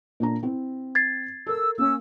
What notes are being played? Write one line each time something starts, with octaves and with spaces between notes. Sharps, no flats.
A#2 D4 A#5
C4 E4
G#6 A6 C7
A4 A#4 E6
A#3 C#4 E6